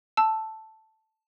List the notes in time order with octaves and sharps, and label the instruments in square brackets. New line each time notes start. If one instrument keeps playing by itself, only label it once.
[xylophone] A5 E6